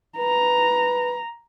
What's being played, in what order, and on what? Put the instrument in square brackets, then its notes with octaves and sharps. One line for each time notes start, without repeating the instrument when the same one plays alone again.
[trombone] B4 [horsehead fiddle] A#5